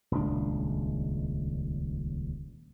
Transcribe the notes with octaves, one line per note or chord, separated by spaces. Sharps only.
D#1 C#2 D4